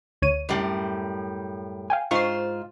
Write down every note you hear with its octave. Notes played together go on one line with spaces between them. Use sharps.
D2 C#5 D#7
F#2 A2 G3
F5 G5 G#5
G#2 F4 C5 C#6 C7